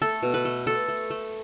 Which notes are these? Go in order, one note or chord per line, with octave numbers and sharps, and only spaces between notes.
A3 A4
B2
B4
A3
A3 A4
A3
A3